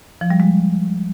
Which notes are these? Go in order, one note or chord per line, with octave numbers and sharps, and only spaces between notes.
F3
G3
G#3